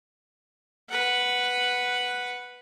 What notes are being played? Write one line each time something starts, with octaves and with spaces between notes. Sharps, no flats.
B4 F#5